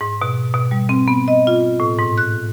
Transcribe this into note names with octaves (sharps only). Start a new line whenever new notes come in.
G#2
B2
B2
G3
C4
B3
D#5
F4
A2
G#2
F#6